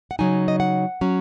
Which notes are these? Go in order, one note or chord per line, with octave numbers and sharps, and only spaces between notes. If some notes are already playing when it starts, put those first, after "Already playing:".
F#5
C#3 F#3 D#4 G#5
D#5
F#5
F#3 C#4